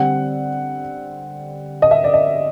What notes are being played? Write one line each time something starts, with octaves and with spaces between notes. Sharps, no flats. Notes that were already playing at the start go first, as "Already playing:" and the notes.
Already playing: D3 G3 C4 F#5
D#5
E5
D5
D#5